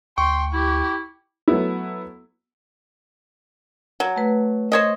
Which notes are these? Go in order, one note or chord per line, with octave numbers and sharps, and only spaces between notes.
D2 G5 C6 C#6
E4 G4
F#3 A3 B3 E4
F#3
A3 B4
C5 C#5 D#5